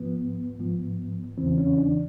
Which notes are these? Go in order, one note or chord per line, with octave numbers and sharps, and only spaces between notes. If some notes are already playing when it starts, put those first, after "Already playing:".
Already playing: G#2 F3 B3
G#2 F3
E2 C#3 E3 C4
C#4
D4